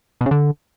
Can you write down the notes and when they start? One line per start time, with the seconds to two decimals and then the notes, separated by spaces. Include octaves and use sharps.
0.21 B2
0.26 C#3
0.31 D3